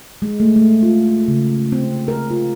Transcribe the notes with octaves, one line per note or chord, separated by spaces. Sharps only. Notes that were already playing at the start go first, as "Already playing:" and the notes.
G#3
A3
A3
F4
C#3
C4
A#4
F4